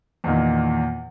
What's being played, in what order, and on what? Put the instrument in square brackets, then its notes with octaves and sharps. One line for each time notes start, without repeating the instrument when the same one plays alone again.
[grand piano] E2 A#2 D#3